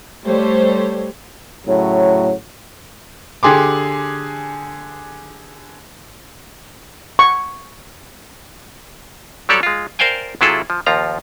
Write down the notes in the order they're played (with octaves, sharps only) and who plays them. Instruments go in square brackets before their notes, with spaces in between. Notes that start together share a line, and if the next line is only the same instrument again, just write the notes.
[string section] G3 A3 G4 C5 C#5
[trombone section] A2 C#3 F#3
[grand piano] D3 G4 G#4 C6 D6
[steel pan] C#6
[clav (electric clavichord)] F#3 G3 G4 A4 C#5 D5
G#3 F4
A#4 C5 D5 F5 G5 G#5
C3 F#3 E4 F4 G#4 A4
F3
D#2 F3 F4 A#5